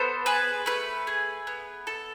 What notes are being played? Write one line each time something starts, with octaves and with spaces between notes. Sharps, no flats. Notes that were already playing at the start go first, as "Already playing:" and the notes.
Already playing: B3 A4 C5
G#4 B4
A3 B4
G#4
B3
A4